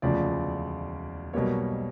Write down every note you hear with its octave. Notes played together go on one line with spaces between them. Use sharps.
E1 D2 C#3 F3 D5
B1 B2 G3 A#3 C#5